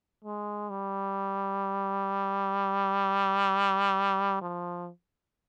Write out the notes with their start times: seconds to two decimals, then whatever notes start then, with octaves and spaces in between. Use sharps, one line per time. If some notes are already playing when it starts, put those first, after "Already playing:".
0.24 G#3
0.70 G3
4.41 F3